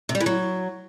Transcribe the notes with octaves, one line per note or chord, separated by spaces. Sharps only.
C3
G3
E3
F#3